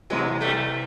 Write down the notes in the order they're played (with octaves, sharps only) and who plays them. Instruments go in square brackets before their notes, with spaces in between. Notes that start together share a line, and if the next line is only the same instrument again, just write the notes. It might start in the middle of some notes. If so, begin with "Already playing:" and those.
[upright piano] C2 C3 E3 [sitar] F#3 G#3
[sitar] G3 A3